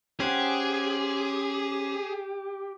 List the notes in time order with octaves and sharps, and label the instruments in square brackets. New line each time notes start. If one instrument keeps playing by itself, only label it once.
[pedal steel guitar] C#4 C5 F#5 [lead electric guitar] G4 [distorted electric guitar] G#4